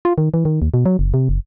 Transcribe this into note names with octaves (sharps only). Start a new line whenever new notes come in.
F4
D#3
E3
D#3
D#2
B2
F#3
F#1
C3
F#1